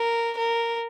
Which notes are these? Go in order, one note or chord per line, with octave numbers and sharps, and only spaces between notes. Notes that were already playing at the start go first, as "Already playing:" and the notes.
Already playing: A#4
A#4